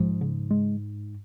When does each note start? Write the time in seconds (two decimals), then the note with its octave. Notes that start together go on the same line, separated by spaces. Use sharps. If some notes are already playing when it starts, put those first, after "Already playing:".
Already playing: G#2 F3 G#3
0.21 C#3
0.51 G#3